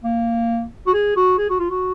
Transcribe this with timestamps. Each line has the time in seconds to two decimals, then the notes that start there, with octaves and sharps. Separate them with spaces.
0.03 A#3
0.87 F#4
0.93 G#4
1.16 F#4
1.38 G#4
1.50 F#4
1.59 F4
1.70 F#4